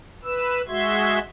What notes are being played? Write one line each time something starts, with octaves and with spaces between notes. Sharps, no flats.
B4 E6
G#3 F#4 E5 C6 G#6